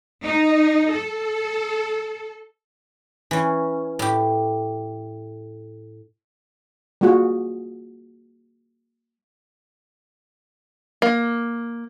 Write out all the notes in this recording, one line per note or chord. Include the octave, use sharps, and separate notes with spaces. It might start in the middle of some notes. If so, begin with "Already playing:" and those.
D#4
A4
E3 C#4
A2 G4
G3 A#3 F4 F#4 G#4
A#3